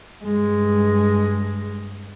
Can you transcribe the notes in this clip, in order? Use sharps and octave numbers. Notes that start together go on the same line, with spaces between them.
G2 G#3